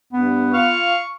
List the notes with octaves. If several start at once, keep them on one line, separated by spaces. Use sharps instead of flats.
G2 B3
F4 F5 C#6